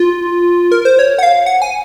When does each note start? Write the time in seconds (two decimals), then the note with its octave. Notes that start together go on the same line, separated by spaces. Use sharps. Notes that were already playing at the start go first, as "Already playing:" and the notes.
Already playing: F4
0.72 A#4
0.85 C5
0.99 C#5
1.19 F#5
1.23 F5
1.46 F#5
1.62 G#5